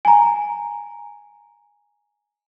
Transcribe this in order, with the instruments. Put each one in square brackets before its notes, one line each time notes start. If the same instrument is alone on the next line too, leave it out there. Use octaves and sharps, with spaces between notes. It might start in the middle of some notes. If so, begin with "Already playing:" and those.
[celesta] G#5 A#5